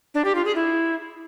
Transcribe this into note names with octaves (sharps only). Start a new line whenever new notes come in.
D4
G4
F4
G#4
E4